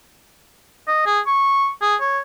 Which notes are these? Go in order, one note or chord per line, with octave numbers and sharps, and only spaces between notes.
D#5
G#4
C#6
G#4
C#5